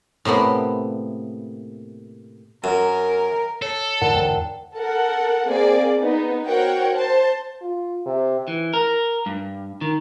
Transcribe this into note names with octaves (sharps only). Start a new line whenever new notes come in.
A2 C3 A#3 B3
F#2 A#4
A4 C#5
G#2 D3 E3 F4 A#4 D5 F#5 A5
E2 G#2 D3 C5 G5
A4 A#4 F#5
A#3 C4 G#4 D5
B3 D#4
F#4 A#4 C5 C#5 F#5 G5
C5 A5
F4
C3
E3
A#4
G2
D#3